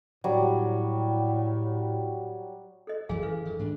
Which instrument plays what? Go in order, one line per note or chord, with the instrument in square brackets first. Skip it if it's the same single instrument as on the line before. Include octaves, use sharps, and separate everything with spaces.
[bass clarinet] A2 [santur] F#3 G3
[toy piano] A4 D#5
[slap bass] F#2 E3 [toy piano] G#4 F5 G#5
[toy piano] A4 B4 F5
[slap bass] D#3
G#2 D4